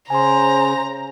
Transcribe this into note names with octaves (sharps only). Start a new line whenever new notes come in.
C#3 C5 G#5 A#5 C6